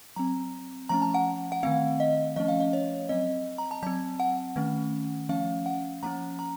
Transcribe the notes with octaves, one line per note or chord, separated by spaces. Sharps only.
F#3 C4 A#5
F3 A3 C#4 A#5
A5
F#5
F#5
D#3 A3 C4 F5
D#5
F3 A3 C#4 D#5
F5
D#5
C#5
F#3 C4 D#5
A#5
A5
F#3 C4 A5
F#5
D#3 A3 C#4
F3 A3 C#4 F5
F#5
F3 A#3 C#4 A#5
A#5